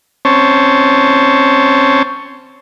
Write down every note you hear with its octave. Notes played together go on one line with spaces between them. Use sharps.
C4 C#4 C5 C#5 A5